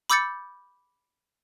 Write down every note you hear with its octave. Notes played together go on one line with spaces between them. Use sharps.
B5 D6 E6 G6 A6 C#7